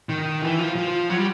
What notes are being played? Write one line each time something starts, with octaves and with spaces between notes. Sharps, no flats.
D#3
E3
F3
F3
F#3
G3